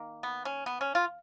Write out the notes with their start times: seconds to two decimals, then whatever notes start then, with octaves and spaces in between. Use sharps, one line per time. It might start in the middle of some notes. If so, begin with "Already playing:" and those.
Already playing: D#3 A#3
0.23 B3
0.45 C#4
0.66 B3
0.81 C#4
0.95 F4